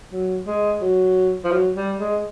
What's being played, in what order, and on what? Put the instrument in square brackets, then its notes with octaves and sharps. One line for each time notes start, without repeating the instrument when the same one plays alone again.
[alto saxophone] F#3
G#3
F#3
F3
F#3
G3
G#3